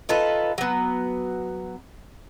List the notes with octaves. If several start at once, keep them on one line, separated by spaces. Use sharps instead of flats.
D#4 F4 A4 B4
F#3 B3